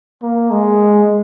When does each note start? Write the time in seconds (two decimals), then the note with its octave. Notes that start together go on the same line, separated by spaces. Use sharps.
0.23 A#3
0.51 G#3